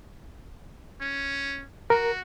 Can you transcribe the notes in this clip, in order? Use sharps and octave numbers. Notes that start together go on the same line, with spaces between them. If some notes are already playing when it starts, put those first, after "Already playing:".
C#4
F#4 A#4